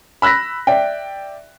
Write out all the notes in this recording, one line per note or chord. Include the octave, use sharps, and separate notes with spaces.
B5 E6 F#6 A#6 B6
D5 E5 G5